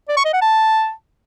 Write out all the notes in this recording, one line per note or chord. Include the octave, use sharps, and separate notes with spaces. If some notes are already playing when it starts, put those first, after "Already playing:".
D5
C#6
D#5
F#5
A5